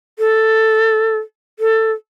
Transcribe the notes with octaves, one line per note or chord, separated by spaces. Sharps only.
A4
A4